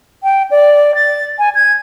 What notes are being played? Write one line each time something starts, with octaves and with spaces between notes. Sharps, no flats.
G5
D5
A6
G#5
G#6